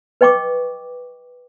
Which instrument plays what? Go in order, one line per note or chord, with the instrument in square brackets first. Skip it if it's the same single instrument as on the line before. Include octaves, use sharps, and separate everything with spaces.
[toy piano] B4 D#5 G5 C#6 D6